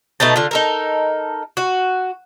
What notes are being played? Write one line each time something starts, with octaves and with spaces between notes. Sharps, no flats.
B2 A3 D#4 A5
D3 F4
D#4 A4 A#4
F#4